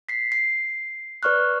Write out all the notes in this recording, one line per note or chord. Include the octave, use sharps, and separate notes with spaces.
B6 C7
C7
B4 D5 C#6 F6 F#6